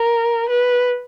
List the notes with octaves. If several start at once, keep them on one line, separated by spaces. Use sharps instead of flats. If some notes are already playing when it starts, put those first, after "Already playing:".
Already playing: A#4
B4